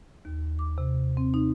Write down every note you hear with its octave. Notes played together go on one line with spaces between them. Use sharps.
D#2
D6
C3
C4
D#4